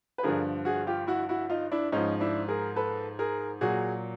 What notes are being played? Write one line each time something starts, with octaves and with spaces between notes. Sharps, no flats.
B4
G2 D3 F3 G#4 A#4
F#4 G#4
F4 G4
E4 F#4
E4 F#4
D#4 F4
D4 E4
G#2 F3 C#4 D#4
D4 E4
G#4 A#4
A4 B4
G#4 A#4
A#2 F#3 F#4 G#4